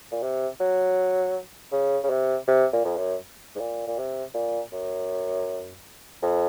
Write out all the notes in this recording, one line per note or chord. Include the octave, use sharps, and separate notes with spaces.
A#2
C3
F#3
C#3
C#3
C3
C3
A#2
F2
F#2
G#2
A#2
A#2
C3
A#2
F#2
F2